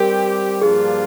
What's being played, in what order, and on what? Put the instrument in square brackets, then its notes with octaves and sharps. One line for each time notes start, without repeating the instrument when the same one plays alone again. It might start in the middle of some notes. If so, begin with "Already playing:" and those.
Already playing: [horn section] G3 C4 G4 [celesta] A#4
[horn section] G2 F3 A#3 D4 F4 [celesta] G#4